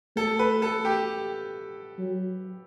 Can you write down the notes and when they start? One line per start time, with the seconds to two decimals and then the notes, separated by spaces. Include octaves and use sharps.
0.16 A3 A4
0.39 B4
0.62 A4
0.85 G4
1.98 F#3